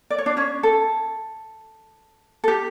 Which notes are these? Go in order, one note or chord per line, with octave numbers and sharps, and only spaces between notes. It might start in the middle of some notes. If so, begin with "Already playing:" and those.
D5
C#5
D4 D5
C#4 C#5
A4
A4
G4